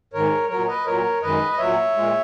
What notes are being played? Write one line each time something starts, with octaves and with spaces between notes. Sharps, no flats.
G#2 D#3 G#3 A#4 C#5
A#2 F#3 A#4 C#5
B4 D#5
A#2 F#3 A#4 C#5
F#2 D#3 G#3 B4 D#5
D#5
A#2 F#3 C#5 E5
A#2 G#3